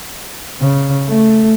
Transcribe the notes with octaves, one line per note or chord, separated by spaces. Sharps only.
C#3
A3